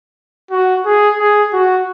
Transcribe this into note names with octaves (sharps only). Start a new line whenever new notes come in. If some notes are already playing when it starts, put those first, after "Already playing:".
F#4
G#4
G#4
F#4